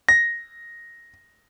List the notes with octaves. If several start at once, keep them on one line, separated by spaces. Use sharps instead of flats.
A#6